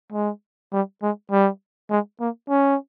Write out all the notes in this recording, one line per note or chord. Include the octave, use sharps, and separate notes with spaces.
G#3
G3
G#3
G3
G#3
A#3
C#4